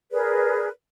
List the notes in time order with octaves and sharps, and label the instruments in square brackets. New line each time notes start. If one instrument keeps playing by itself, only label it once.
[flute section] G#4 A#4 B4 D5